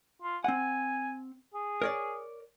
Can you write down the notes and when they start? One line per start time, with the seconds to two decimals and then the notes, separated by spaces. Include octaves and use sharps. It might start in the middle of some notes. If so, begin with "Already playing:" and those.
0.22 F4
0.44 C4 F#5 G#5
1.54 G#4
1.82 A#4 C#5 D5